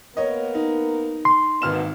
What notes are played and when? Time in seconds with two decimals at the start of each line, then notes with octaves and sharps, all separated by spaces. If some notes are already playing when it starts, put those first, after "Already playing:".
0.17 A#3 B3 A#4 C#5 D#5
0.55 D#4
1.25 C6
1.62 G#1 B2 A#3 B3 F6 E7